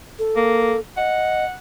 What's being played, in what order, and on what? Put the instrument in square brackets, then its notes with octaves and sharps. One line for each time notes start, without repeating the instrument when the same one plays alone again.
[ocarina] A4
[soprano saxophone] A#3
[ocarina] D#5 [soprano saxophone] F#5